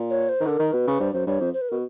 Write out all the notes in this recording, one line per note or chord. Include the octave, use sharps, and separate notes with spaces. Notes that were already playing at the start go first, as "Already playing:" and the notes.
Already playing: A#2
C#5
C5
D#3
D3 A#4 B4
D#3
B2 B4
C#3
G2 C5
F#2 C5
G2 C#5
F2 C5
C5
B4
B2 A#4